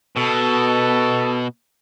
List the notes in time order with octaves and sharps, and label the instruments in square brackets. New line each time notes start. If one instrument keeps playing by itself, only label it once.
[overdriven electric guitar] B2 [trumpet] A4